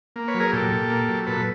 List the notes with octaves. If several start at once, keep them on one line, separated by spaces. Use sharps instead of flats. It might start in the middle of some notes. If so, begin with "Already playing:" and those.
A#3
B4 C#5
F#3
G#4 A#4
A#2 G4 A4
A#2
A#3
F#3
A#2 A4 B4